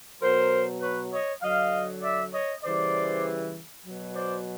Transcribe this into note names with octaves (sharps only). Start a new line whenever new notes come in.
B2 F#3 A#4 C5
B4 C#5
C#5 D#5
D3 F#3 D#5 F5
D5 E5
C#5 D#5
C#3 E3 G3 C5 D5
B2 F#3
C5 D5